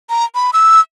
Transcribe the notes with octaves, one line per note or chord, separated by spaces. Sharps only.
A#5
B5
E6